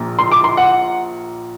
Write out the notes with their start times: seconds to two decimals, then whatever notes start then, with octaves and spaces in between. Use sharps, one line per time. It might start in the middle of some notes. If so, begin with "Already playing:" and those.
Already playing: A#1 A#2
0.19 C6
0.31 D6
0.44 C6
0.57 F#5